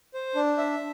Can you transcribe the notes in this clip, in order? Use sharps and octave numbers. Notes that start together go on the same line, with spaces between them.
C5
D4
E5